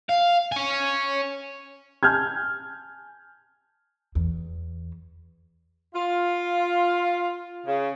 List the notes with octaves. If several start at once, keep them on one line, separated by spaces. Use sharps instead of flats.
F5
C#5 G#5
G#5 A5 F6 G6 G#6
E2
F4
C#3